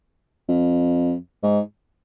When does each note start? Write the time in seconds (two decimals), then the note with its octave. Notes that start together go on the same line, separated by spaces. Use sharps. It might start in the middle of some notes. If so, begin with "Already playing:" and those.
0.49 F2
1.43 G#2